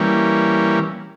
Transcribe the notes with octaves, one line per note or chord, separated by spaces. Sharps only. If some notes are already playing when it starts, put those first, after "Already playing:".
Already playing: E3 G3 A#3 C#4